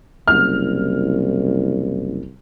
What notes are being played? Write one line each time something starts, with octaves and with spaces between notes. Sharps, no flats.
F#1 C2 F6